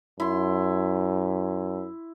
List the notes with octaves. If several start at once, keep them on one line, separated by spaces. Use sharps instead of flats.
F#2 E4 C6